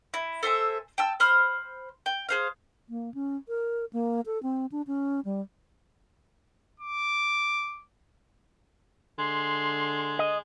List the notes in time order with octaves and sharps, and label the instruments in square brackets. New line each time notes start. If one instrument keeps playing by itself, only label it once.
[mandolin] E4
A4 C5 E5 G#5
G5 A5 E6
C5 B5 F6
G5
G#4 C5 F5
[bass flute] A#3
C#4
A#4
A#3
A4
C4
D4
C#4
G3
[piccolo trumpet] D6
[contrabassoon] D3 [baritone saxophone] G#3 [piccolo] C6
[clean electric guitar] D#5